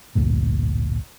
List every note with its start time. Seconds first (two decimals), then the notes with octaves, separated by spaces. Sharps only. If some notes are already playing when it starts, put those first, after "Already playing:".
0.15 A1 D2 G2 A#2